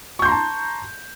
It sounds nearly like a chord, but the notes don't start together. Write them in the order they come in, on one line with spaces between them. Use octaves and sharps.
C#6 G6 C6 A#5 A5